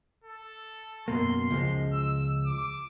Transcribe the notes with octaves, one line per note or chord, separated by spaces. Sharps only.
A4
F#2 B2 A#3 C6
C#2 F3 G#3
E6
D6